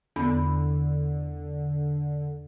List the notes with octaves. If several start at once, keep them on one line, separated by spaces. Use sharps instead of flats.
E2 D3 B3